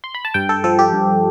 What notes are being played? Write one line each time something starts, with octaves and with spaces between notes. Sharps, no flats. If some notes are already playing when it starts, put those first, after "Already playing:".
C6
B5
A5
G2 G5
A4
F3 A4
G4
G2